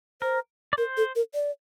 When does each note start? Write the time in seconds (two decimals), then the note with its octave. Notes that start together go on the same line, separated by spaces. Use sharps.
0.22 A#4 C5
0.73 D5
0.78 A#4 C5
0.97 A4
1.16 A#4
1.34 D5